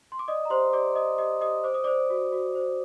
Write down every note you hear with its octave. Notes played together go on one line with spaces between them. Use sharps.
C6
D6
D5 D#5 D#6
A#5
G4 C5 C6
G4 D5 D6
D5 D#5 D#6
G4 D#5 D#6
G4 D#5 D#6
C5 D6
D#6
C5 D5 D6
F#4
F#4
C5